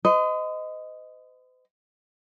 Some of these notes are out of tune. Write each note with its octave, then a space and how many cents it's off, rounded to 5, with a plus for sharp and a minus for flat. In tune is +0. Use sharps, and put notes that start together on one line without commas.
C5 -45 D#5 +0